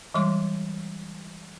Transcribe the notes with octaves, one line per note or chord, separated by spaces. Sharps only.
E3 G3 G#3 C6 D6